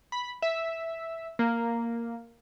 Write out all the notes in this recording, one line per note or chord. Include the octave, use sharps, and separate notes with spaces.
B5
E5
A#3